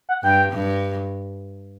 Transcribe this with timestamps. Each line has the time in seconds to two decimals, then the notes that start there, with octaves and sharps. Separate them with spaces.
0.09 F#5
0.23 G2 G5
0.52 G2